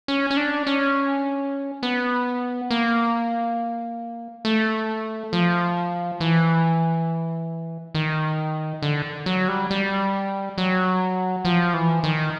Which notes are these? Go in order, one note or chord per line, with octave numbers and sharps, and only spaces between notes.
C#4
C#4
D4
C#4
B3
A#3
A3
F3
E3
D#3
D3
F#3
G3
G3
F#3
F3
E3
D#3